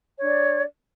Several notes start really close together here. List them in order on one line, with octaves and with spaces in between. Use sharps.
C#5 D4 D5